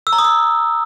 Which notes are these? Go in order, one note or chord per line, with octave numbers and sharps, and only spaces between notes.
E6
A#5
D#6
E6